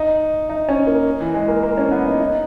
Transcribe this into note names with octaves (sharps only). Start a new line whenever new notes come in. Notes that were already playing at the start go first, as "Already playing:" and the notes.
Already playing: D#4
D#4
C#4
A#3
E3
G#3
A#3
A#3
C#4
B3
D#4
D#4